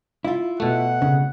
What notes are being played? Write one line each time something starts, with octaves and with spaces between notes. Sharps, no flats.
E4 F4
B2 A3 F#5
C#3